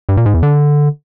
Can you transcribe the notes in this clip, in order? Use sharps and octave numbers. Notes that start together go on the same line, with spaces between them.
G2
A#2
G#2
E2
D3